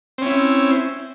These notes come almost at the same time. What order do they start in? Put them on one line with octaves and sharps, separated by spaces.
C4 C#4 E4